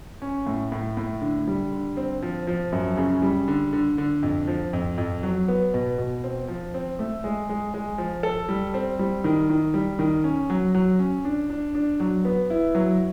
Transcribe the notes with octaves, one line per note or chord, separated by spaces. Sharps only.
C#4
A2
A2
A2
D3
G3
D3
C4
F3
F3
F#2
C#3
G3
D3
D3
D3
F2
F3
F2
F2
F#3
B3
B2
B2
C4
F3
C4
A3
G#3
G#3
G#3
F3
A4
G3
C4
G3
D#3
D#3
G3
D#3
C#4
F#3
F#3
C#4
D4
D4
D4
F#3
B3
E4
F#3